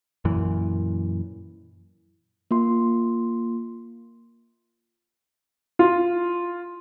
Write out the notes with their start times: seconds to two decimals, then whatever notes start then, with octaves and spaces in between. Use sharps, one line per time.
0.25 F#2 A#2 E3
2.51 A#3 F4 C6
5.79 F4